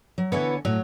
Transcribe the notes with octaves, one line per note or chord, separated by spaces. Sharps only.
F#3
D3 E3 B3 C#5 G#5
A2 F#3